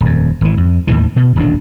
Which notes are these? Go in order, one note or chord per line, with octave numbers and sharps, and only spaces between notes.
D#1 F2
G#1 E3
F2
D#2 A2 D#3 E3
B2
D#1 A1 D2 D4